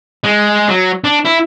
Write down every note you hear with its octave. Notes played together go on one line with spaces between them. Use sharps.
G#3
F#3
D4
E4